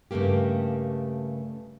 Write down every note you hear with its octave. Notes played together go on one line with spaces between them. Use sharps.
G2 C#3 A3 A#3 G4